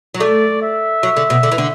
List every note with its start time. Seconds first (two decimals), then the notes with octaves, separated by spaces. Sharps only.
0.14 F#3
0.20 A3 D5
0.62 E5
1.03 F#3
1.17 D3
1.30 B2
1.43 D3
1.52 E3
1.58 D3